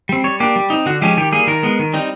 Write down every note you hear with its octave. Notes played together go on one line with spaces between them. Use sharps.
G3 C4
G3 C#5
A#3 D4 G4
G3
C4 D#4
D3 F#4
F3 G#3 C#4 G4
D#3 G4
G3 A#3 G#4
D#3 A#4
G#3 B3
D#3
G3 C4 D#4